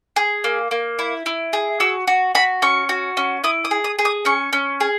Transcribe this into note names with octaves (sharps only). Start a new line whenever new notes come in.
G#4
A#3
A#3
E4
E4
G#4
F#4 E6
F#4
F#4 B5
C#4 C#6
F#4
C#4
E4 D#6
D#6
G#4
D#6
G#4
D#6
C#4 C#6
C#4
G#4